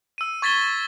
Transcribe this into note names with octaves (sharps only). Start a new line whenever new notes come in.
E6 D#7
C#6 G#6 A6 B6 D#7 G7